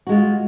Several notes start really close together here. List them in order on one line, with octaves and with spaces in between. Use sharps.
F#4 G#3 F4